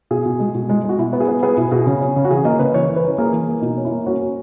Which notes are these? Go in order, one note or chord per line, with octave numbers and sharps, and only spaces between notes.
B2 G#4
B2
G#3
B2
G#3
G#3 F#4
B2 E4
B3
G#4
B3
B3 G#4
B2 E4
B2 G#4
C#3
C#4
C#3
F#4
E3 G#4
A#3 D#5
C#3 B4
E3 C#5
E3
B4
C#4
A#3 G#4
E3
A#3
B2 D#4
C#4
E4
A#3
C#4 F#4
C#4